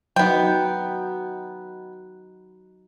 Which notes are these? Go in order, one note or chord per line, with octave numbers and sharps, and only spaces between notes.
F#3 B3 D#4 G5